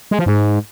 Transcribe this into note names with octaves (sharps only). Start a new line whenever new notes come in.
G#3
F3
G#2